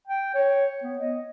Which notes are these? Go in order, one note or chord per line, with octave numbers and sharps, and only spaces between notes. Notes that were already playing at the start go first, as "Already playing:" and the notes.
G5
C#5
B3
D#5